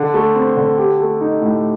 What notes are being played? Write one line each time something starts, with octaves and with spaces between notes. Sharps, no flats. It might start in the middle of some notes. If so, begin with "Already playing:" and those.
Already playing: D3
A3
C4
D3
G4
A3
D#4
A2